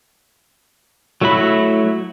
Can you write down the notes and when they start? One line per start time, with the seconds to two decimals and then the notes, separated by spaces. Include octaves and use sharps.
1.21 F#3 A3 E4 F#4 B5